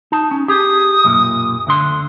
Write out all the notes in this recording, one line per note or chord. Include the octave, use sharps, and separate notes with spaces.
D#4 A5
C#4
G4 G#4 D#6
B1 F#2 A#2
D2 D3 C6